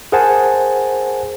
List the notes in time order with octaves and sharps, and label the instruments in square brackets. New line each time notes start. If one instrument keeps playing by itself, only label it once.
[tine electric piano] G#4 A#4 C5 F#5 G#5 A5